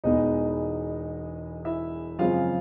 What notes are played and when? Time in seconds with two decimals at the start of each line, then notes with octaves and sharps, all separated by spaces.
0.04 E1 E2 B2 G#3 B3 D#4 D#5
1.65 E4 E5
2.19 F#2 C#3 F3 G#3 C4 F4 F5